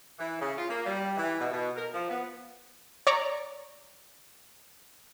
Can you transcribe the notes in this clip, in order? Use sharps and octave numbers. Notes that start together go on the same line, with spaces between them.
E3
C#3
F4
A#3
G3
E3
B2
B2
A#4
F3
B3
C#5 D5 A#5